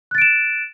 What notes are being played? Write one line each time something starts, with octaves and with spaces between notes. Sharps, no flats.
F#6 A6 D7 E7